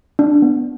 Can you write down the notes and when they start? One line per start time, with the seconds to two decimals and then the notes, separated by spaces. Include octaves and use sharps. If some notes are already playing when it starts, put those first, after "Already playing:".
0.19 D4
0.42 B3